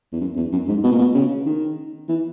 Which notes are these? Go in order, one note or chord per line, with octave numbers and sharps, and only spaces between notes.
E2
F#2
E2
F#2
G#2
B2
A#2
B2
C#3
D#3
E3